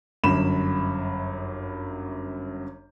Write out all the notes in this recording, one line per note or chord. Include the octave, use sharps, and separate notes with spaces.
G1 F#2 B5 E7